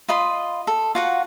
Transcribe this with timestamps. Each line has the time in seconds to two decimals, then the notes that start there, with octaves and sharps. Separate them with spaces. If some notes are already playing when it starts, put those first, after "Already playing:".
0.08 F4 D#5 B5 C6
0.67 A4
0.95 F4 F#4 F#5